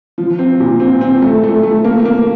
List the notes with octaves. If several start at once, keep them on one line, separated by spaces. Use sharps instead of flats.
F3
C4
A#2
C4
C4
A3
A3
A3
A#3
A#3